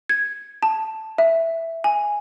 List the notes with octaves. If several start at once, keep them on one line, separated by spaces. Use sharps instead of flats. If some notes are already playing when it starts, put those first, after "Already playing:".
G#6
A5
E5
G#5